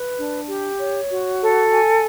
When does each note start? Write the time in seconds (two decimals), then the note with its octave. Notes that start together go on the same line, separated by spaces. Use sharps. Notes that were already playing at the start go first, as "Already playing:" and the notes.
Already playing: B4
0.18 D4
0.49 G4
0.80 C#5
1.11 F#4
1.41 A4
1.72 G#5